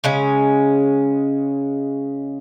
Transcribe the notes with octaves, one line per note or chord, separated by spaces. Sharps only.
C#3 G#3 C#4